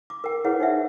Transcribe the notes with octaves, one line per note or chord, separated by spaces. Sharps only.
D6
A#4 G5
E4 G#4 A#4 B4 C#5 F#5
D#4 C5 D5 E5 F#5